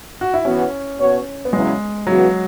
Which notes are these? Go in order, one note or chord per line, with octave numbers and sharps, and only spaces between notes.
F#4
E4
E3 B3 C#4 F#4
B2 B3 F#4 C#5
B3
E2 C#3 F#3 G#3 C#4 E4
C#3 E3 F#3 B3 F#4